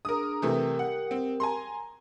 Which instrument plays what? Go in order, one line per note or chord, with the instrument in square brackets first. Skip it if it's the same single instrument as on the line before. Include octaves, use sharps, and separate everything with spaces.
[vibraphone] D4 G#4 [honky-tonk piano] A#4 D#6
[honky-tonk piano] C3 E3 A3 [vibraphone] G4 A#4 G5
[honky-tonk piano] F#5
C4
G#5 A#5 C6